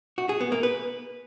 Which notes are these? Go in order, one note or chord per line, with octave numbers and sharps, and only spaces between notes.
F#4
G#4
B3
A#3
B4